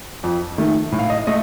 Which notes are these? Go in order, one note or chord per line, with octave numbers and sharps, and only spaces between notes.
F2
D#3 A3
A2
F5
D#5
A3 D#5